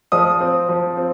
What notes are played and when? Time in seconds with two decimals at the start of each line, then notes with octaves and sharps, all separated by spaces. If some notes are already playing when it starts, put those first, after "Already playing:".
0.12 F3 D#6
0.41 C4
0.69 F3
0.97 C4